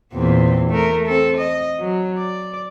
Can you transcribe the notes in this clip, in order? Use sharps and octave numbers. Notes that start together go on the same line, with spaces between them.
E2 A#2 C4
A3 A#4
C4 A4
D#5
F#3
D5